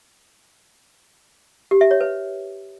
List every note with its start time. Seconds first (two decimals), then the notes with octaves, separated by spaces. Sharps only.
1.71 G4
1.81 E5
1.91 C#5
2.01 B4